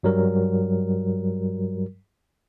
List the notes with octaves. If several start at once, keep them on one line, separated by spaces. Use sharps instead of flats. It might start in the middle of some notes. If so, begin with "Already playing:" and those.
G2 F#3 G3 A#4